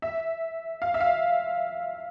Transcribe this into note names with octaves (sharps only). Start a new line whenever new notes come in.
E5
F5
E5
F5